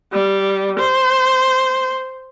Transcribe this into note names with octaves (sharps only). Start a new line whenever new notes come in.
G3
C5